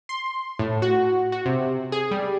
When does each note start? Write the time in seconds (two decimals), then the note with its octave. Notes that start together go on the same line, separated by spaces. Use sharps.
0.09 C6
0.59 A2
0.82 F#4
1.32 F#4
1.46 C3
1.92 G#4
2.11 G3